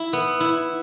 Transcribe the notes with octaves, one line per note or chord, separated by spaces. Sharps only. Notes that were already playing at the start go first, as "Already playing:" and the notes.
Already playing: E4
B3
E4